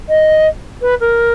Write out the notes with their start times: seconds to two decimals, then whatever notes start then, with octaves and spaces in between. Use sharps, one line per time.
0.08 D#5
0.81 B4
1.00 A#4